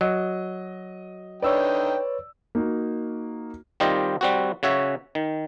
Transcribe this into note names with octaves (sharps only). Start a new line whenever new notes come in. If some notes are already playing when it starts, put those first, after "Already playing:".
F#3 D#5
D3 D#4 B4 C#5 D5 G5 E6
A#3 D#4 F#4
D#3 G3 C4 F4 G4 D#5
G3 C4 F#4
C#3 F#4 C#5 E5
D#3